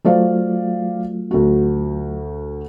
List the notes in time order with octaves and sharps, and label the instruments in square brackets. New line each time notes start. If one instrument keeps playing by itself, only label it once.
[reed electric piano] F#3 A3 F4 [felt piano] C5 D5 F5
[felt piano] D2 F#4